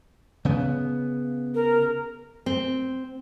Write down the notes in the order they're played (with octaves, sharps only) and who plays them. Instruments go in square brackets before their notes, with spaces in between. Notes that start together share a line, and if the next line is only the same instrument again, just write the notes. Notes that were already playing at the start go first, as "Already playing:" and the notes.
[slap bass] C#3 B3
[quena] A#4
[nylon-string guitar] C4